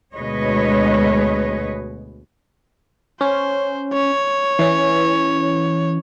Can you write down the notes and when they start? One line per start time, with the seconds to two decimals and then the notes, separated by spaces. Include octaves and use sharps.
0.15 D2 B2 G#3 B4 C#5 D#5
3.21 C#4 C5
3.93 C#5
4.59 E3 C#4